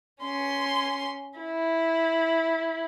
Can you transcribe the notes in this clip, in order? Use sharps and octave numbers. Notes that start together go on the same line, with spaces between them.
C#4 C6
E4